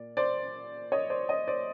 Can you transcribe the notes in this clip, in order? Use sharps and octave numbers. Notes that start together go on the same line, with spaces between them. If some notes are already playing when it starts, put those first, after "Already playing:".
Already playing: A#2 D5
C5 D5
C#5 D#5
C5 D5
C#5 D#5
C5 D5